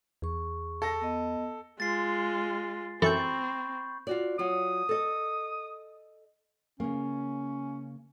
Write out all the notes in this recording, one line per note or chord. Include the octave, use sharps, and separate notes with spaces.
E2 G#4 C#6
A4 A#6
B3 D#5
G#3 F4 A6 C7
F#2 E3 C4 A4 B5 C#6 G6
F4 F#4 D5
F#3 F4 D#6
A4 D#5
C#3 A#3 C#4